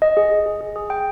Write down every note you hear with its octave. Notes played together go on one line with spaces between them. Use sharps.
D#5
G#4
G#4
G#4
G#4
G#4
G5